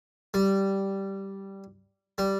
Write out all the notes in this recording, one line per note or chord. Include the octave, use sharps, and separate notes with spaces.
G3
G3